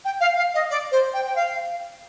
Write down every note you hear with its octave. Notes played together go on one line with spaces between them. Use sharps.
G5
F5
F5
D#5
D5
C5
G5
G5
F5